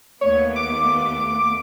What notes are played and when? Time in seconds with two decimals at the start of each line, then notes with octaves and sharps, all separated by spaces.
0.21 D#2 A3 B3 C#5
0.56 D6